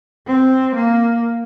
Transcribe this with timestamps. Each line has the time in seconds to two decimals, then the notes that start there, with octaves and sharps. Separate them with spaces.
0.27 C4
0.76 A#3